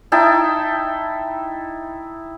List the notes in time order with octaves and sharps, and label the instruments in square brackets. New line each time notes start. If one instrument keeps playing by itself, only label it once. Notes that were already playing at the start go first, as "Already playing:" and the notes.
[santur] D#4 E4 G5 A5